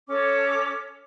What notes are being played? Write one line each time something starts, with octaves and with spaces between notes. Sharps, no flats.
C#4 A4 C#5 D6